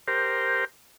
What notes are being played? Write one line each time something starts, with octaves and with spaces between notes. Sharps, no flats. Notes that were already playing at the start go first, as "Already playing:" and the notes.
G4 A#4 C5